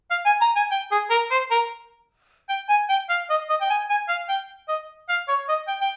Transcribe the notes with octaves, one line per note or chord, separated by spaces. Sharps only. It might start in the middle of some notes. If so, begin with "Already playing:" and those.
F5
G#5
A#5
G#5
G5
G#4
A#4
C5
A#4
G5
G#5
G5
F5
D#5
D#5
G5
G#5
G#5
F5
G5
D#5
F5
C#5
D#5
G5
G5